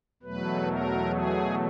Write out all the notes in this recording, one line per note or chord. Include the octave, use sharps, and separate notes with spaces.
E2 B2 F#3 A3 B4
A#4
G#4